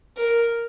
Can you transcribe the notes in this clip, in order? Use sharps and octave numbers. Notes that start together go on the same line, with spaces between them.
A#4